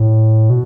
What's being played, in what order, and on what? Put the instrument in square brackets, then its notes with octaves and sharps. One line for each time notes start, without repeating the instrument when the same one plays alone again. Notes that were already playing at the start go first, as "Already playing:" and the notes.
Already playing: [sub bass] A2
B2